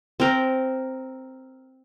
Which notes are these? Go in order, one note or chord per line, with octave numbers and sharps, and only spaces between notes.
C4 A#4